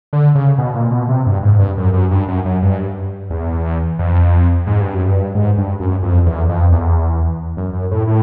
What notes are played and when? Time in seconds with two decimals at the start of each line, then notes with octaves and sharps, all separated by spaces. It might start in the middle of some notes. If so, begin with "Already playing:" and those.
0.13 D3
0.35 C#3
0.58 B2
0.75 A#2
0.91 B2
1.09 C3
1.26 G2
1.43 G#2
1.59 G2
1.78 F#2
1.93 F#2
2.11 G2
2.28 F#2
2.45 F#2
2.62 G2
3.30 E2
3.99 F2
4.67 G#2
4.80 G2
4.94 F#2
5.09 G2
5.35 G#2
5.58 G2
5.80 F#2
6.03 F2
6.26 E2
6.49 F2
6.72 E2
7.57 F#2
7.73 F#2
7.91 A2
8.07 A2